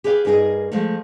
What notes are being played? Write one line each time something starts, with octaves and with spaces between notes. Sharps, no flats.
G4 G#4 B4 C#5 F5
G2 A#3 D#4 G#4 B4 D#5
F3 G#3 A3